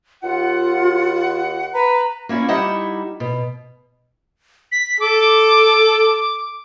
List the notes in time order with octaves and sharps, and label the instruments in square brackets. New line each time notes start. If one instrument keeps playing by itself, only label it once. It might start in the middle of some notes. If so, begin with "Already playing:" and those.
[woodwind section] D#2 F#5 [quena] F4
[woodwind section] B4 [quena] A#5
[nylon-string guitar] A#3 C#4 E4 D5
G3 D#4 E4 G4 D#5 F#5
B2
[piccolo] B6
[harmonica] A4 [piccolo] D6